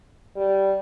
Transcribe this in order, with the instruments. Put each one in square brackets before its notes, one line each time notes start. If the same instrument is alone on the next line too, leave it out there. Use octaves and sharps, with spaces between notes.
[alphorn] G3